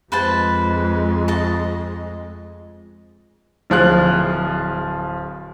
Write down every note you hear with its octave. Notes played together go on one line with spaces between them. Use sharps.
F2 G#3 B4 C5 A5
D#5 A5
D1 F3 G#4 F#6